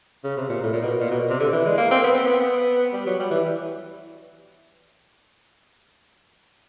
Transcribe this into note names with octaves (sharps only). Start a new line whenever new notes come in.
C#3
C3
A#2
A2
A#2
B2
A#2
B2
C3
D3
E3
G#3
A#3
C4
B3
C4
B3
G3
F#3
G3
E3